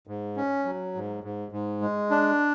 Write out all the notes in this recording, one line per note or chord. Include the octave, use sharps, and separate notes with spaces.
G#2
C#4
F#3
G#2
G#2
G#2
G#3
D4